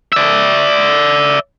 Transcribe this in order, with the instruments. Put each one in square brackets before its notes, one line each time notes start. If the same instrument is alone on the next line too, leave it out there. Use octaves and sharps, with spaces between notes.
[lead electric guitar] D5 E5